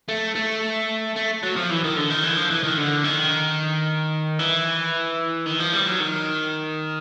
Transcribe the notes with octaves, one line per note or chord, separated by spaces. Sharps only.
A3
A3
A3
F#3
F3
E3
D#3
D3
D#3
E3
F3
E3
D#3
D3
D#3
E3
D#3
F3
G3
F#3
D#3